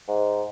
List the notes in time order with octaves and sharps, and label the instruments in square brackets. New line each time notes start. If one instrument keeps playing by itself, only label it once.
[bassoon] G#2